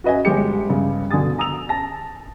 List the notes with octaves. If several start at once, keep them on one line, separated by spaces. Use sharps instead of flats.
F#4 B4 D#5 E5 G#5
G1 G#3 G4 C#7
G2 C#3
B2 D3 G#5 D#6 A6
A#5 D#6 E6 F7
A5 A#6